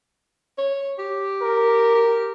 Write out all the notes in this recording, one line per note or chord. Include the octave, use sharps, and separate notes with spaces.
C#5
G4
A#4
G4